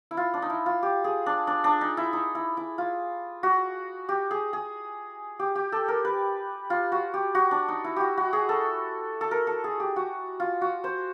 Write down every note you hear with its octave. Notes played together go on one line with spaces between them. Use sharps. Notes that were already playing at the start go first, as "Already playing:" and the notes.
E4
F4
D4
D#4
E4
F4
G4
G#4
D4
D4
D4
D#4
E4
D#4
E4
E4
F4
F#4
G4
G#4
G#4
G4
G4
A4
A#4
B4
F4
F#4
G4
F#4
D4
D#4
E4
F#4 G4
F#4
G#4
A4
A4
A#4
A4
G#4
G4
F#4
F4
F#4
C5